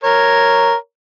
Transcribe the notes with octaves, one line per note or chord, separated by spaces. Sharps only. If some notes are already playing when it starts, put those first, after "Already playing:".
A#4 C#5